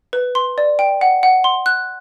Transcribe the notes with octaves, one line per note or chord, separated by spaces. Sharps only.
B4
C6
D5
G5
F#5
F#5
C6
F#6